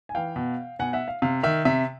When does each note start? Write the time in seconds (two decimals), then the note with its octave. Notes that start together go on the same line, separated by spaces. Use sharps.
0.09 G#5
0.15 E3 F5 G5
0.36 B2
0.79 B2 F#5 G#5
0.93 E5 F#5
1.08 F5
1.22 C3 F5
1.43 D#3 E5
1.65 C3 E5